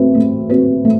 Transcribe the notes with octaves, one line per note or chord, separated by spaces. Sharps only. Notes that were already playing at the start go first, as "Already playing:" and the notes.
Already playing: A3 C4 F#4 B4
A3
C4 F#4 B4
A3